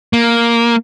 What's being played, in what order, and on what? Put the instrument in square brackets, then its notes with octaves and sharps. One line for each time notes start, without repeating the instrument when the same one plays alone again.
[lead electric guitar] A#3